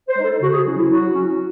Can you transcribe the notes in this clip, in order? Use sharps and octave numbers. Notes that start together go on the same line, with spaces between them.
C5
G#3 D#4
A4
C#3 F#4
G#4
F#3 C#4 E4 F#4
E4
F#3 F#4
C#4 E4